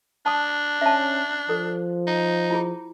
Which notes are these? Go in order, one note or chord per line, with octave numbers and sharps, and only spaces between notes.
D4 A5 D#6
C#4 E5 A5
F3 A4
D#4
E4 F4 G#4